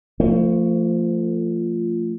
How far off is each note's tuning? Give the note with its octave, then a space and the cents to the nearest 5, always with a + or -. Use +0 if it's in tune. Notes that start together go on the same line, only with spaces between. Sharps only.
F3 -10 A3 +35